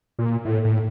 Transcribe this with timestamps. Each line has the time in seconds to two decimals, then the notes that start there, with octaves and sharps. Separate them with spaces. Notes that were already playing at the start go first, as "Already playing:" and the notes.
0.19 A#2
0.45 A2
0.64 A2